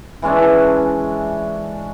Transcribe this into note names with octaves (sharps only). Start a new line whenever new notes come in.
E3 G#3 C#4 D4